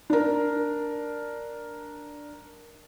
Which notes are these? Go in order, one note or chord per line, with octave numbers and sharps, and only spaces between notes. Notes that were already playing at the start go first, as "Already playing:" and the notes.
D4 A#4